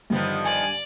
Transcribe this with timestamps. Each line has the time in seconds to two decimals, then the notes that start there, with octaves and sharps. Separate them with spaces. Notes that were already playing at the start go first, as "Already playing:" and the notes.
0.10 G2 D3 D#3 F3 B3 G4
0.45 D5 G#5